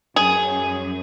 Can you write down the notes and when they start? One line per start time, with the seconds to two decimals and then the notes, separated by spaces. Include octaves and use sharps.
0.16 F#2 G#4